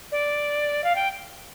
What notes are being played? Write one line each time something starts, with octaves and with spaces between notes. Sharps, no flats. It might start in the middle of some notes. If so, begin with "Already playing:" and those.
D5
F5
G5